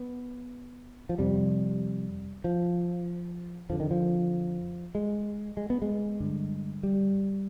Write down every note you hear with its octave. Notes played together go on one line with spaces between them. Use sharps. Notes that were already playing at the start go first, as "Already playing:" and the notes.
Already playing: B3
F3
F2 C3 G3
F3
F2 D3 F3
D#3
F3
G#3
G#3
B3
G#3
G2 D3
G3